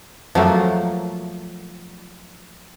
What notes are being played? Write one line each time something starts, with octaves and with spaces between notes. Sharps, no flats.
F3 F#3 A3 A#3